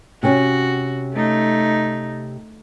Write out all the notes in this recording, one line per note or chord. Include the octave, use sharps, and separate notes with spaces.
C3 C#4 F#4
A3 D#4